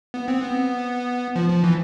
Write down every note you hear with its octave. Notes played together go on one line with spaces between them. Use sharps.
B3
C4
B3
F3
F3
E3